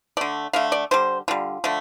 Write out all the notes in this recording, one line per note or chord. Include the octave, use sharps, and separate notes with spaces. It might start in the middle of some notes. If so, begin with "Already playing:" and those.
D3 A3 D5
D3 A3 F5
D5
D3 G3 C5
D3 G3 F4
D3 F3 A3